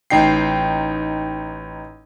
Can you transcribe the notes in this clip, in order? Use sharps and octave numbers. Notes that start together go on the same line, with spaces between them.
A1 D#4 G5 C7